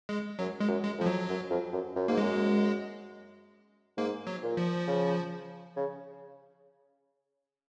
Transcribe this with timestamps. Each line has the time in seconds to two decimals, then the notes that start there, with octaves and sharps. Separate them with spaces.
0.09 G#3
0.39 F#2 F#3
0.60 G#3
0.68 F#2
0.83 G#3
0.99 F2 F3
1.06 F#3
1.28 F#2
1.50 F2
1.73 F#2
1.96 F#2
2.08 G#2 A#3
2.18 F#2 G#3
3.97 G#2 A#3
4.27 F#3
4.43 A#2
4.57 F3
4.87 C#3
5.76 C#3